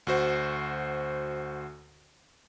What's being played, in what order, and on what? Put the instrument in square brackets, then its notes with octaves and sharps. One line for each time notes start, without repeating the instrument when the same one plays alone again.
[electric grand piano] D2 F#4 C5